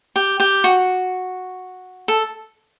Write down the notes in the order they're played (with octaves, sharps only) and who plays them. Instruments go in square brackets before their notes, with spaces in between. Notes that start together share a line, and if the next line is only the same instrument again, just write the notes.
[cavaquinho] G4
G4
F#4
A4